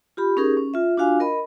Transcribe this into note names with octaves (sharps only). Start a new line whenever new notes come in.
F4 G4 B5
C#4 D#4 G4 G#4 A#4 C#6
C#4
F4 E5
D4 F4 F#4 F5 G#5
A#4 D#5 B5